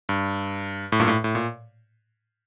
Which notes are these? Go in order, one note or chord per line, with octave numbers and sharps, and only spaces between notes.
G2
A2
G2 A#2
A2
A2
A#2